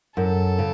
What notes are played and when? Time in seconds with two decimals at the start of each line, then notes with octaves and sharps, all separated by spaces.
0.17 F#2 A4
0.58 C#3